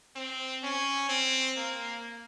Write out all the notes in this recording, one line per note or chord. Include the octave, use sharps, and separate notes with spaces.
C4
C#4
C4
A#3